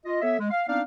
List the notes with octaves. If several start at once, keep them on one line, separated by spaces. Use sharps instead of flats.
F4 D#5
B3 A4 C#5 E5
G#3
F5
B3 C4 D4 D#4 D5 F5